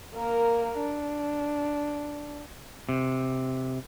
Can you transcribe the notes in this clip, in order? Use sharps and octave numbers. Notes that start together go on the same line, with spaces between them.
A#3 A#4
D4
C3